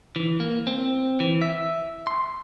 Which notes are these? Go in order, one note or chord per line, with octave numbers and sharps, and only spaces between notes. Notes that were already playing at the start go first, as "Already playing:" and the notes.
E3
A#3
C4
E3
E5
C6